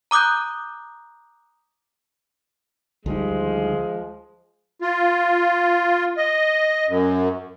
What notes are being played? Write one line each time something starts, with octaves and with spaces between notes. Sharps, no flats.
A#5 D6 D#6 F#6 G6
D2 D#3 F3 G3 G#3
F4
D#5
F#2